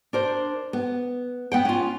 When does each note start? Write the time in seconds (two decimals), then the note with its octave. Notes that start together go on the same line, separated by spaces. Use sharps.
0.13 D4 A#4 C5
0.73 B3
1.52 B3 F#5 G5
1.65 C#4 F4